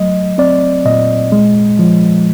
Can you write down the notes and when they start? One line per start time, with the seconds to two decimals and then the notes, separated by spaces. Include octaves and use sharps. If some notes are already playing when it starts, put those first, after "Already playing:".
Already playing: F#3 A3 D#5
0.38 C4 D5
0.85 A#2 D#5
1.32 G#3
1.79 F3